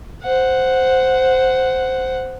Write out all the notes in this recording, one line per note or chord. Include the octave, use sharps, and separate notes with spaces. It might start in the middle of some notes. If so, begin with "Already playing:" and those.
C5 F#5